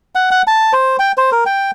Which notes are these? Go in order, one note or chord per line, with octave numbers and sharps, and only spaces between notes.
F#5
F#5
A5
C5
G5
C5
A#4
G5